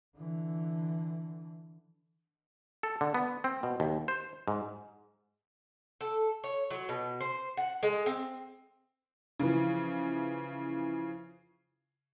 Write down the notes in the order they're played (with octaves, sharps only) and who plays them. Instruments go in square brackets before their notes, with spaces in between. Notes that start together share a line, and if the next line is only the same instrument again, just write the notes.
[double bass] D3 E3
[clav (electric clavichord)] A4
D3
B3
C4
B2
D#2
C5
G#2
[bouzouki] A4
C#5
F#3
B2
C5
F#5
G#3
C4
[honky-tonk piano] C#3 E3 F3